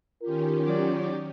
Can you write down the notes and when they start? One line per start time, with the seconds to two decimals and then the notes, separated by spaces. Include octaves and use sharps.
0.22 D#3 C#4 F4 G4 A#4
0.62 F#3 D5